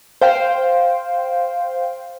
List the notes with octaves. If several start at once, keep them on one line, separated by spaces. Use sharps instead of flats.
C5 F5 G5